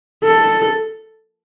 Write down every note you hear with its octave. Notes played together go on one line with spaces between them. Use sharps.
A4